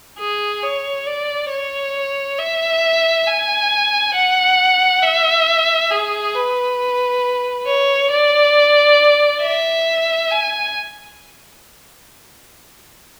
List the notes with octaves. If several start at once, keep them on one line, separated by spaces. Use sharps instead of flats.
G#4
C#5
D5
C#5
E5
G#5
F#5
E5
G#4
B4
C#5
D5
E5
G#5